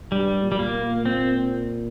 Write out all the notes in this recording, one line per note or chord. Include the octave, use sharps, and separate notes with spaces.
G2 G3
A#2
G3
A#3
A#2
C4